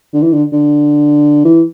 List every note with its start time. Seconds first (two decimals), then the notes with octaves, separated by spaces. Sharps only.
0.14 D3
0.22 E3
0.33 D3
0.52 D3
1.45 E3